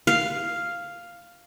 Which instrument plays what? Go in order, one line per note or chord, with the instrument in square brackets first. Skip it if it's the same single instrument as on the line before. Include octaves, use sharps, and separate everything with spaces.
[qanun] F5